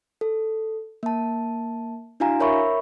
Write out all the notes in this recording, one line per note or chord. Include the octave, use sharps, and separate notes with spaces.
A4
A#3 A5
D4 E4 F#4 F5 G#5 A#5
A#4 C#5 E5 B5 C#6